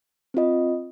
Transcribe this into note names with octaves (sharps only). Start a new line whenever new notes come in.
C4 F4 D#5